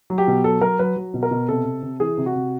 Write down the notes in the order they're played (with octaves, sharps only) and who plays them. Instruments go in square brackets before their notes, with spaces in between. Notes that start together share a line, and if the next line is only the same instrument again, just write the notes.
[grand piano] F#3
G4
B2
F#3 A4
F#3 A#4
F#3 B4
F#3
B2
A#4
B2
C3 A4
C3
C3
E3 G#4
C3
F#4
C3